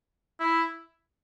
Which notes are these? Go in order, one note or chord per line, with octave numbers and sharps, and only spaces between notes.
E4